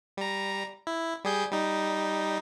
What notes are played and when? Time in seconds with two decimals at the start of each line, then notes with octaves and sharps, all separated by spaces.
0.17 G3 A#5
0.87 E4
1.25 G3 G#4 G6
1.52 G3 D#4